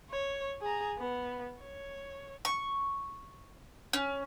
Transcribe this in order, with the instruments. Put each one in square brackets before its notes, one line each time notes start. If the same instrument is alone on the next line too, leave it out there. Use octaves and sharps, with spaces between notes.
[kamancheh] C#5
G#4 A#5
B3
C#5
[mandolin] C#6
C#4